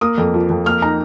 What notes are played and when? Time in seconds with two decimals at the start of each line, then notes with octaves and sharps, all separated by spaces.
0.01 A#3 D#6
0.18 F2
0.34 F3
0.50 F2
0.66 A#3 F6
0.82 D#4 A#5